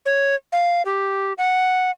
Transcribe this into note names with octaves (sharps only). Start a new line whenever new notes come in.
C#5
F5
G4
F#5